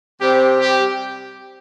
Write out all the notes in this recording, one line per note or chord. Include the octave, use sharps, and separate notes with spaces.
C3 G3 C4 G4
G4